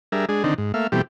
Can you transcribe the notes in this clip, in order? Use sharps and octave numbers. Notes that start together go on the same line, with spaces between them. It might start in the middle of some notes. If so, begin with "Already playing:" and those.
G3 D4 G#4 A#4 E5
G#3 D4 G#4
D3 D#3 C4 D4 D#4
G#2
A3 A#3 E5 F5
B2 E3 G3 A3 C4 G4